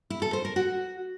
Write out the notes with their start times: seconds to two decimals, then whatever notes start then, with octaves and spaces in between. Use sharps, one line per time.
0.10 E4
0.22 A4
0.33 C5
0.45 A#4
0.56 F#4